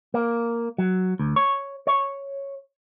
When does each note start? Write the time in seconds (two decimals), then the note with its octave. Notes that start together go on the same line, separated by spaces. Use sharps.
0.14 A#3
0.78 F#3
1.19 D2
1.36 C#5
1.87 C#5